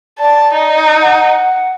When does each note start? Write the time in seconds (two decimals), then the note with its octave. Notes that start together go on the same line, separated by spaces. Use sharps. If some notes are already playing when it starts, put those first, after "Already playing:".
0.19 D5 A5
0.53 D#4
1.02 F#5